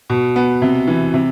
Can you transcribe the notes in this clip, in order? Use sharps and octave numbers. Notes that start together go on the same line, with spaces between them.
B2
B3
C3
E3
C3